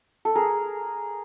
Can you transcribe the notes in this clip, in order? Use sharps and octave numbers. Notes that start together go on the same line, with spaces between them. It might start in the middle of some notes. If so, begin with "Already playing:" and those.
A4
G#4 A#4